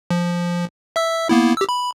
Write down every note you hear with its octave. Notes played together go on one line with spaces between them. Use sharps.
F3
E5 E6
A#3 B3 E4
G4 E6
B5